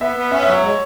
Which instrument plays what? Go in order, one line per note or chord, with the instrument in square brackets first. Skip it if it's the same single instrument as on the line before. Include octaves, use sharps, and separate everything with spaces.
[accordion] B3 [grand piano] E5
[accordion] B3
[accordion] C#4 [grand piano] E5
[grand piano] E5
[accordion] F#3 [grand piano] C#5
[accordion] G#3 [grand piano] C#5